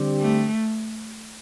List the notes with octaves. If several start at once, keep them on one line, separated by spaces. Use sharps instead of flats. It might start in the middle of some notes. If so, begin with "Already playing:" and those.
Already playing: D3 G3 C4 G4
A3